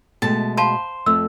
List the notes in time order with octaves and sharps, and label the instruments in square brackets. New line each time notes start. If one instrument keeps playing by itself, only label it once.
[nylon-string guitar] B2 G#3 A3 [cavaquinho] A5
[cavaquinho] C5 [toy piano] F5 A5 B5
[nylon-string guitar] F2 A3 C4 [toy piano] E6